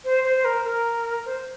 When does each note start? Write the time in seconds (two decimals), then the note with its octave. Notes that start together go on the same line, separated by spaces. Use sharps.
0.04 C5
0.24 C5
0.45 A#4
0.65 A#4
1.26 C5